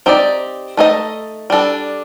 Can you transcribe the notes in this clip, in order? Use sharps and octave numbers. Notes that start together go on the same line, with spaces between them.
C4 D#4 G4 D5
A3 D#4 A4 C5 D#5
G3 D4 A4